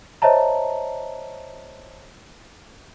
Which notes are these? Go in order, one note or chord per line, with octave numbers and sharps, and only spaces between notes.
C5 C#5 D#5 E5 A5 A#5